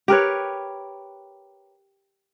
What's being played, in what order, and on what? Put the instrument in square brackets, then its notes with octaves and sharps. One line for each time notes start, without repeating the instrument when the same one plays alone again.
[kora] G4 A#4 B4 C#5